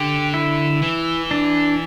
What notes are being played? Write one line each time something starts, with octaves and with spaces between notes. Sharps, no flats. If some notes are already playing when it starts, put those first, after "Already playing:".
Already playing: D3 G4
E4
E3
D4